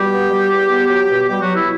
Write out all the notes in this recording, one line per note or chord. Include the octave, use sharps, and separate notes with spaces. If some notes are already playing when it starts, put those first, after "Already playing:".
Already playing: B2 G3 G4
B3
G3
E2
B3
F#3
B2
B2 G3 G4
F#3 F#4
B2
E4